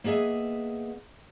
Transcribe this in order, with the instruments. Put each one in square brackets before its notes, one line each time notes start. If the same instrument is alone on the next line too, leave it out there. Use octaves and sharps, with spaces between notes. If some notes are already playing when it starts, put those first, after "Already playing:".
[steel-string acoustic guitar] A#3 B3 G#4 D#5 E5